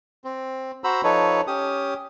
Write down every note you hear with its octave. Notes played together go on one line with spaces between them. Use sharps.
C4
F#4 C5 A#5 B5 E6
F3 D#4 A4 B4 C#5
C#4 G4 D#6